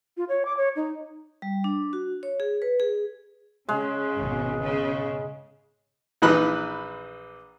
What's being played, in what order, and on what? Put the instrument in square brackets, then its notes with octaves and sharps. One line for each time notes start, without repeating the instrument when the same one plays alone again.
[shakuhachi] F4
C#5
D6
C#5
D#4
[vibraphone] G3
D4
F#4
C#5
G#4
B4
G#4
[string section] C#3 [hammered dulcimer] G#3
[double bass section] G#1 B2
[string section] C#3
[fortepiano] A#1 E3 D#4 B4 F#6